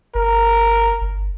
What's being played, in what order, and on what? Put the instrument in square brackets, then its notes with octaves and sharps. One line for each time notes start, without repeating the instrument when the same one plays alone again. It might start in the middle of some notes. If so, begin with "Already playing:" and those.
[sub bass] G1 [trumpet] A#4
[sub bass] G1